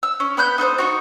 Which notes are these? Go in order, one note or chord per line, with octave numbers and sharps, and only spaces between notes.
E6
C#4
B3 B5 F#6 G6
D#4 A4 A#4 C5
D#4 F4 F#4